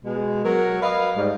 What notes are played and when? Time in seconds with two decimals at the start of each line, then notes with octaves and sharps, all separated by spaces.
0.05 B2 G#3
0.45 F#3 A#4
0.82 B4 D#5 F5
1.17 G#2 G3